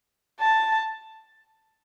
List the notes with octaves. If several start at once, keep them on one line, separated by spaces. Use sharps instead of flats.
A5